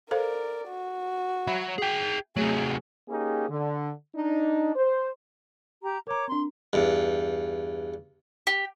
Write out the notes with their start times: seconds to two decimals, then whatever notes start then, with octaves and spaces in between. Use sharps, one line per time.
0.11 A4 A#4 C5 D5 F5
0.68 F#4
1.47 F#3 E5 B5
1.78 G#4 G5
2.37 C3 F#3 A3 G#4
3.09 A#3 C#4 D#4 G4 G#4
3.49 D3
4.15 D4 D#4
4.76 C5
5.82 G4 A#5
6.07 A#4 C#5 A#5 D6
6.28 C4 D4 C6
6.73 E2 G2
8.47 G4